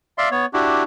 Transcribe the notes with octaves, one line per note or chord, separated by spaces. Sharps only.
D5 E5 F5 C6
B3 C#5
D4 E4 F#4 G4